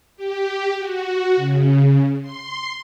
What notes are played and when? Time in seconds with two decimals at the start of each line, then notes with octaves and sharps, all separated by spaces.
0.16 G4
0.76 F#4
1.36 C#3
2.21 C6